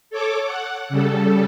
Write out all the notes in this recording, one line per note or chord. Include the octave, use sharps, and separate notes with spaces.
A4 C#5 D6
F#5
C#3 G3 A4